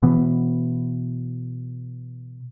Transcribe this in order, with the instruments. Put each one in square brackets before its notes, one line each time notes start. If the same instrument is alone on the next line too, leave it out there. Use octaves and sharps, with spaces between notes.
[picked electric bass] B2 E3 B3